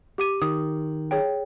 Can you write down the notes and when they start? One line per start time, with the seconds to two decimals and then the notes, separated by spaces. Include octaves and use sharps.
0.18 G4 D6 D#7
0.42 D#3 D#6
1.11 G#4 C#5 G5